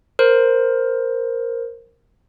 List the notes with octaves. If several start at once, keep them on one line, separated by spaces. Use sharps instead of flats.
A#4 C5